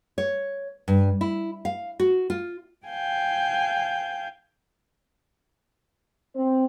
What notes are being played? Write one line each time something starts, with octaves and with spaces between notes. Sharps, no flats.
C#5
G2
E4
F5
F#4
F4
F5 G5 G#5 G6
C4